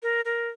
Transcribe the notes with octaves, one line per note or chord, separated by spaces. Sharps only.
A#4
A#4